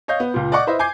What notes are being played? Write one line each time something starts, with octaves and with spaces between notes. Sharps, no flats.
C#5 D#5 F5 G6
B3
C#2 A#2
D5 D#5 F#5 C#6 D6
E4 B4 C5 D#5 E5
G#5 D6 G6 G#6 C7